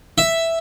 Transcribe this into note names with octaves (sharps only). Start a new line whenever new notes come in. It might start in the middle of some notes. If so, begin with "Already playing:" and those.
E5